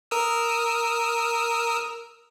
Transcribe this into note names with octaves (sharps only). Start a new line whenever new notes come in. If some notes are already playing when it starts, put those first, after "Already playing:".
A#4 D#6 E6